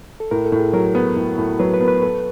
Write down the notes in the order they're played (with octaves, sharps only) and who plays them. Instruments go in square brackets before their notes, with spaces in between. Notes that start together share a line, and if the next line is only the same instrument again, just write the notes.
[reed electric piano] A4
[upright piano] A2 [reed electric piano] A#4
[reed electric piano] A4
[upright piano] A2
[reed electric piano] G#4
[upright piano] F#3 [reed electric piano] A#4
[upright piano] B3
A2
A2
[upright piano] F#3 [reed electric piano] B4
[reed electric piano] B4
[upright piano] B3 [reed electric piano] A#4
[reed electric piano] B4
[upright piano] A4 [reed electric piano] B4